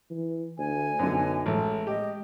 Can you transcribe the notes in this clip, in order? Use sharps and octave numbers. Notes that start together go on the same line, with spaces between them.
E3
D2 G#5
B1 F#2 D3
A1 G#3 A3
G4 D#5